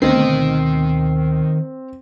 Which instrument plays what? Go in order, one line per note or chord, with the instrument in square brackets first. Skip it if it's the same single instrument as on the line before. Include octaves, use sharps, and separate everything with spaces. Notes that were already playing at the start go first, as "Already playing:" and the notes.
[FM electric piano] D2 B2 C7 [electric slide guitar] D#3 D#5 [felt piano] C4